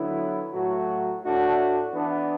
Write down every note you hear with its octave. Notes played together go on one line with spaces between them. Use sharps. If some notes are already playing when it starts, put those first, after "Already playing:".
Already playing: D3 F#3 B3 E4
A2 F#3 A3 F#4
A2 A3 D4 F#4
E3 B3 D4